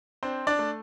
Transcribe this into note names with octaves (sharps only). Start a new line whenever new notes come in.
C4 D4 C5
D4 D5
A3